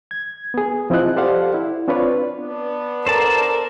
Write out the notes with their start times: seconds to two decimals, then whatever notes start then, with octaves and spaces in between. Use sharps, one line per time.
0.11 G#6
0.54 B3 G#4
0.90 F3 C4 E4 F4 D#5 F#6
1.16 G4 A4 C5 D5 F5 F#5
1.54 E4
1.88 C4 D4 F4 B4 C#5 D5
2.39 B3 D4
3.06 A4 A#4 C5 D5 A5